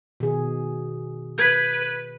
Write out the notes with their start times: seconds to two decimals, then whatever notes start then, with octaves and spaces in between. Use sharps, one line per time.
0.20 B2 D#3 G#4
1.38 B4 G6 G#6 B6